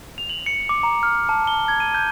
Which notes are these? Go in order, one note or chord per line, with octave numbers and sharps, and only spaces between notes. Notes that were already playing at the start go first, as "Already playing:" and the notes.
F7
F#7
C#7
D6
A#5
F6
A5
G7
G#6
D#7
G6